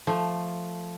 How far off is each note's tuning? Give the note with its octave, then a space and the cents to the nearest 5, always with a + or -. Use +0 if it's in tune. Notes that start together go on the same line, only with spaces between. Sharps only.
F3 +0 A3 +0